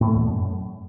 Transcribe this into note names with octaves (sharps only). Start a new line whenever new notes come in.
A2
A3
E2
A#2
F#2